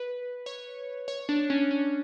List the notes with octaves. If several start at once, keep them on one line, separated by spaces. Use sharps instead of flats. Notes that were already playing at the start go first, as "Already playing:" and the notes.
Already playing: B4
C#5
C#5
D4
C#4
C#4